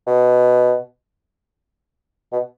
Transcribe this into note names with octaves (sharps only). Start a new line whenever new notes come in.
B2
B2